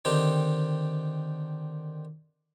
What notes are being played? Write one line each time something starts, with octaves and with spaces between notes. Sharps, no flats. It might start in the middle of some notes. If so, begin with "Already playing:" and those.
D3 D#3 C4 D#4 G4